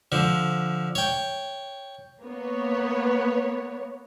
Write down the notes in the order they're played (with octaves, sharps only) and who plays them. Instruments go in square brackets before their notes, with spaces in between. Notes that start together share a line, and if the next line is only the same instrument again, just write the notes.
[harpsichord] D3 F3
C#5 G5
[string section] A#3 B3 C#5